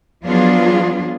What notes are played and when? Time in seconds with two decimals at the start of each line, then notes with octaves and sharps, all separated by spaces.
0.24 F3 F#3 B3 D4 F4 G#4